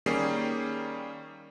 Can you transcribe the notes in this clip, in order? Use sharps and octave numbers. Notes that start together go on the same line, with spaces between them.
D#3 G3 A#3 C#4 G#4 C7